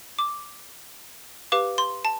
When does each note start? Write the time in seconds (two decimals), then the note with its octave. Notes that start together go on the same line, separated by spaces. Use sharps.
0.19 D6
1.52 G4 B4 F5 D6
1.78 C6
2.05 A5